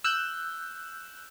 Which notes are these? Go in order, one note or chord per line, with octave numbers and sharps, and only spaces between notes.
E6 F#6 G6